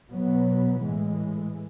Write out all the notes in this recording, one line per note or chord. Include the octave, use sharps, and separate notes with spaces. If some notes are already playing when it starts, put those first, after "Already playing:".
B2 F#3 B3
A2 E3 G#3